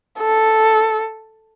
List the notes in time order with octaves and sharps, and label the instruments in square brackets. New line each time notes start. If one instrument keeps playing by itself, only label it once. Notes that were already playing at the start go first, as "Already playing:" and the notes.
[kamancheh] A4